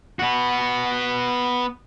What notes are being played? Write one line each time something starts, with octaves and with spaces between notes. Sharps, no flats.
B3 F#4